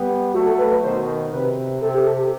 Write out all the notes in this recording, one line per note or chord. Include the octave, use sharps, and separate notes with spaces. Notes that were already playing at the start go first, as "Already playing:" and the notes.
Already playing: G3 B3
F#3 A3 F#4
A4
B4
B4
B2 D#3 C5
C3 B4
C3 A4
G4
A4
G4